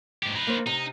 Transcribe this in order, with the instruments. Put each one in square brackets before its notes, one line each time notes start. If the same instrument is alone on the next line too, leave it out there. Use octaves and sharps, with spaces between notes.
[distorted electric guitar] G#2 G4
D#4 B4
[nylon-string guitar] A#3 C5
[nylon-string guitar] C3 [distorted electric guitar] D#4